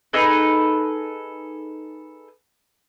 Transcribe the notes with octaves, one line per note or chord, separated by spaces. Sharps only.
D#4 G#4 A4 B4